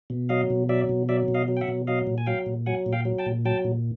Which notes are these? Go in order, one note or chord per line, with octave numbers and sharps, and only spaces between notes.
B2
F#3 D#5 F5
B2
F#3 D5 E5
B2
F#3 D5 E5
B2
D#5 F5
F#3
G5
E5 F#5
B2
F#3 D#5 F5
A#2
G#5
F#3 F5 G5
A#2
F#3 F#5 G#5
A#2
F5 G5
F#3
G5 A5
A#2
F#3 G5 A5
A#2